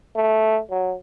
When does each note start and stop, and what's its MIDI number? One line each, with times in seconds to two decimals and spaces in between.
0.16 0.60 57
0.71 0.94 54